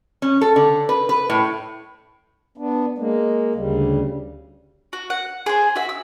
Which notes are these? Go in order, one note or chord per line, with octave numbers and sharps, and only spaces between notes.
C#4
A4
D3
B4
B4
A2
B3 D4
G#3 A#3
D2 C#3 G3
F#4
F#5
G#4 C5
F#4 E5
E6